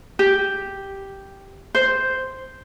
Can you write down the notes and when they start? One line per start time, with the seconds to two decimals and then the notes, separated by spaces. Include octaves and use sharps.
0.19 G4
1.75 C5